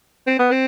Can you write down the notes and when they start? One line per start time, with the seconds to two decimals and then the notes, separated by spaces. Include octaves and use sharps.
0.27 C4
0.39 B3
0.51 C4